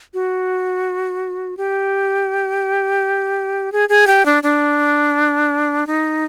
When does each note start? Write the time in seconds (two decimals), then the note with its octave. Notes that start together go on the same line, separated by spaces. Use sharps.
0.14 F#4
1.57 G4
3.72 G#4
3.89 G#4
4.07 G4
4.26 D4
4.43 D4
5.87 D#4